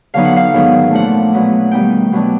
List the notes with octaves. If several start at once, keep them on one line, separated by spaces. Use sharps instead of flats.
D3 F#3 B3 D#4 F5
F#5
F5
G#2 D#3 F#3 B3
A#2 F3 A3 D4 F#5
B2 F#3 B3 D#4
D#3 G3 B3 D#4 G5
B2 F#3 B3 D4